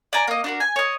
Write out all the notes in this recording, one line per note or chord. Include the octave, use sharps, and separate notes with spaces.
D5 G5 G#5 A#5
A#3 D#5
D4 F#4 A#4
G#5
C#5 D#5